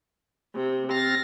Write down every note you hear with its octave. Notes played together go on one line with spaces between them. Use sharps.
C3
C4 F6 A6 A#6